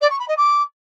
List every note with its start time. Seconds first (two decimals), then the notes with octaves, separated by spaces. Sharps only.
0.01 D5
0.10 C#6
0.19 B5
0.28 D#5
0.37 D6